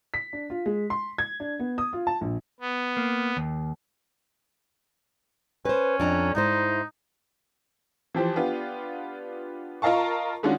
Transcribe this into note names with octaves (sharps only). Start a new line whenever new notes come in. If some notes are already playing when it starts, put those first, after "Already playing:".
B6
D4
F4
G#3
C6
G#6
D4
B3
D#6
F4
A5
A#1
B3
A#3
D#2
C#4 B4 C5
F2 D4 A#5
G#2 D#4 E4 C5
E3 F3 G4 C5
B3 D4 F4 G4
F4 A#4 D#5 F5 A5 C#6
D#3 G#3 C#4 D4 F4 F#4